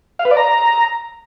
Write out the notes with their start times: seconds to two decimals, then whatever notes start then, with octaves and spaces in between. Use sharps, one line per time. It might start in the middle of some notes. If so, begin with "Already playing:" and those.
0.19 F5
0.25 B4
0.31 D5
0.37 A#5